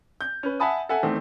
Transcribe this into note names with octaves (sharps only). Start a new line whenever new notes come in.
G6
C#4 B4
E5 F#5 G#5 A5 B5 D#6
A4 E5 F#5 G#5
E2 D#3 A3 C4